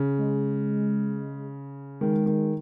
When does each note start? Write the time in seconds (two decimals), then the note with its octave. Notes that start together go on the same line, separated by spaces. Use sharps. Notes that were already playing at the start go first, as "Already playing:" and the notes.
Already playing: C#3
0.18 G#3
2.01 D#3 G#3
2.26 D#3